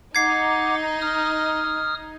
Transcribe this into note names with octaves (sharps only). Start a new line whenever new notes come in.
D#4 F#5 D6 G#6 C7
D#6 F6